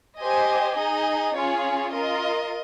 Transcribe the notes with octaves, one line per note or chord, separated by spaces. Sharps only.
G4 C5 D#5 G#5
D#4 G#4 D#5
C#4 F4 G#4 C#5
F4 A#4 D#5